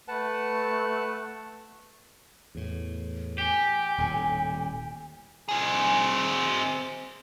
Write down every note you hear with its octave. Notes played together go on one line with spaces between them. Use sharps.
A3 B4 F#5 A5
E2 A2
G4 G#5
D#1 A2
C4 G#4